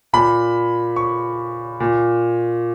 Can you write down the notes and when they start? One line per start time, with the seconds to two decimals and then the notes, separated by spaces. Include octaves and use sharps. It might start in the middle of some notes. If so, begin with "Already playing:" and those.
0.13 A#2 B5
0.96 C#6
1.80 A#2